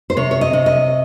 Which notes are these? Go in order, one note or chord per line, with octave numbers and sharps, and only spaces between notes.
C5
C3 C#5
C#5
D#5
C3
D#5